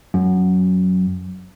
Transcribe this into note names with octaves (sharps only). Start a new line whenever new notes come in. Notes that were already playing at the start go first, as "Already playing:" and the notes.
F#2